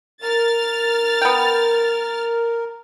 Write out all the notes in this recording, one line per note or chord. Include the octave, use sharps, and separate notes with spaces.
A#4 F6 A6
B3 G5